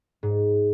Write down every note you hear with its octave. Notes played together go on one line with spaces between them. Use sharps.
G#2